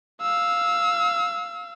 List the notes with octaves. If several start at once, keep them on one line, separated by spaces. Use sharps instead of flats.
F5 E6